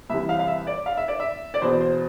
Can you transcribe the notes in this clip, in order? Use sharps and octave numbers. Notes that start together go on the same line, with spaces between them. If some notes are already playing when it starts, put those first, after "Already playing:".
C2 C3 E3 E5
F5
F5
E5
D5
F5
E5
D5
E5
D5
E2 B2 C5
C5